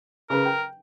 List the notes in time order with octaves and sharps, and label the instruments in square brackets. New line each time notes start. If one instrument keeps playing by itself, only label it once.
[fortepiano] C#3 B4 [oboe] A#4
[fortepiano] G5